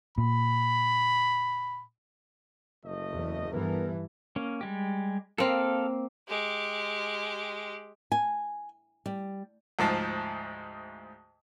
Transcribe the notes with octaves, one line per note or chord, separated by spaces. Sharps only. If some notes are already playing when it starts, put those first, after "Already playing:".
A#2 B5
F#1 A3 D#5
E2
G2 E3 B3 A4 A#4
A#3 C#4
G3 G#3 G4
A#3 C4 A4 F5
G#3 G4
G#5
G3
D2 G#2 F3 A5